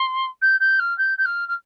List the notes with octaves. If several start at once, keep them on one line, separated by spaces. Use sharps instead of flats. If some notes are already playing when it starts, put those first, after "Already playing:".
Already playing: C6
G6
G6
F6
G6
G6
F6
F6